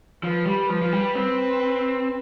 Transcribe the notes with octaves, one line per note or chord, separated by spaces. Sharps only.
F3 B4
G3
F3 B4
F3
G3
C4